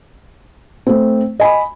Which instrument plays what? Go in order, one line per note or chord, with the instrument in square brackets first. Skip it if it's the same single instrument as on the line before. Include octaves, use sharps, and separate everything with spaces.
[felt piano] A3 C4
D#5 G#5 B5